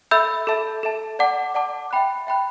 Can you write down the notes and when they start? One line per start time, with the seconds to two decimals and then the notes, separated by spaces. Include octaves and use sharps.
0.11 A4 E5 B5 E6 G6
0.47 A4 E5 A5
0.83 A4 E5 A5
1.19 D5 F#5 A5 D6
1.55 D5 F#5 A5 D6
1.91 E5 G5 B5 F#6
2.27 E5 G5 B5 F#6